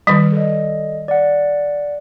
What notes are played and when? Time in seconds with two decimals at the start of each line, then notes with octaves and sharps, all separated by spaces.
0.07 D#3 G3
0.32 A4 D5 D#5
1.08 D5 F#5